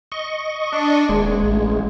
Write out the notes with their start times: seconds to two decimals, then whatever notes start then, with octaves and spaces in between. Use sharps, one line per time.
0.12 D#5 C#6
0.72 D4
1.09 D#1 G#3
1.43 A1